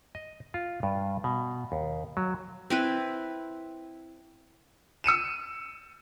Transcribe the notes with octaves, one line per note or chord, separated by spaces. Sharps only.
D#5
F4
G2
B2
D#2
F#3
C4 E4 B4
E6 C#7 D#7 E7